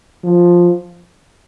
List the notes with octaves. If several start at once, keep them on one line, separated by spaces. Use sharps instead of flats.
F3